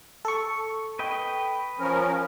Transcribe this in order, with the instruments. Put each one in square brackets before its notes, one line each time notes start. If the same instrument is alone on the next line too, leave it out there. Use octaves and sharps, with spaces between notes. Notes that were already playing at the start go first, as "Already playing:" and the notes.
[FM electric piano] A4 C#6
[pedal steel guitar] B4 D#5 G5
[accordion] F3 C#4 A#4